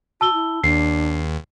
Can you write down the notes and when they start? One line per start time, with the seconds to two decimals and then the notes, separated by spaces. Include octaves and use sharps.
0.21 F#4 A5 E6 G7
0.33 E4
0.64 D#2 D4 C7